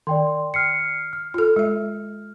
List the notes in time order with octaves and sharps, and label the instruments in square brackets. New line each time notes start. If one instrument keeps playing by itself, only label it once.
[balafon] D#3 [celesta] D5 G5 C6
[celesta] F6 C7 C#7
F6
[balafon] F4 A4
G#3 E5